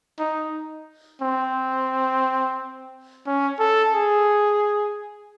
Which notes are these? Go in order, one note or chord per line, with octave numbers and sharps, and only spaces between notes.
D#4
C4
C#4
A4
G#4